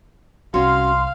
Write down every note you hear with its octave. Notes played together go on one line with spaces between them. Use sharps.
C2 C#4 F#4 F5 C6 F6